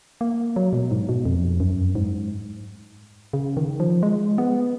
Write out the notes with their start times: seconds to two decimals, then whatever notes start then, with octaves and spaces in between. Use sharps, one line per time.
0.21 A#3
0.56 F#3
0.73 B2
0.91 G#2
1.09 B2
1.25 F2
1.60 F#2
1.95 G#2
3.33 C#3
3.57 D#3
3.80 F3
4.03 G#3
4.38 B3